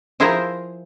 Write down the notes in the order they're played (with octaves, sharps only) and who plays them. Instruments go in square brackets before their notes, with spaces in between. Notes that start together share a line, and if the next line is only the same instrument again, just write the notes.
[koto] F3 E4 G#4 A#4 C5 A#5